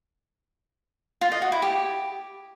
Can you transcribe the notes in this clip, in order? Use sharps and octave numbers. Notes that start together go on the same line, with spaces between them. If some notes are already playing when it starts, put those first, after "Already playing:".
F4
D#5
F#4
E4
G4